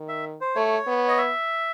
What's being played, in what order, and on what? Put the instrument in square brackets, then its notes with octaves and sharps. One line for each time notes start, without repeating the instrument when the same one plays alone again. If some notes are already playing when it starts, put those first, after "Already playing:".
Already playing: [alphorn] D#3
[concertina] E5
C5
[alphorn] A3 [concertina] C#5
[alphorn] B3
[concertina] D#5
E5